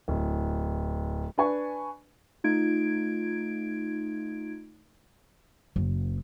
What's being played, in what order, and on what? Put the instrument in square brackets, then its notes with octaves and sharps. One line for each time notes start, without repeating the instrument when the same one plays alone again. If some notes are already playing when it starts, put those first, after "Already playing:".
[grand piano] D1
[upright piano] D4 B4 G#5 C#6
[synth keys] A3 D#4 F4 G#6 D7
[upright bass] F#1